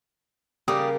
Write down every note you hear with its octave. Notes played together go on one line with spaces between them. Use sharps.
C#3 G3 A#3 G4 D5 D#6